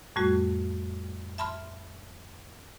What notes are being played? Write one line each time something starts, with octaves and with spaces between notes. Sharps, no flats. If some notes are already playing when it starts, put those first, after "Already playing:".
F2 A2 G3 A3 F#4
E5 A5 B5 C6 F6